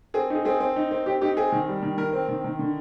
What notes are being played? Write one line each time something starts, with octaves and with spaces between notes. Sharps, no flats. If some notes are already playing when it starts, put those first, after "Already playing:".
C4 G#4
D#4 G#4
C4 G#4
C4
D#4
C4
C4 G4
D#4 G4
C4 G#4
D#3
G3
D#3
D#3 A#4
C4
D#3
D#3
D3